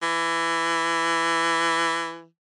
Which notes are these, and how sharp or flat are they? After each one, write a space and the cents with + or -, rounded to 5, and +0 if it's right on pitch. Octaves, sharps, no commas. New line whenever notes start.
E3 +15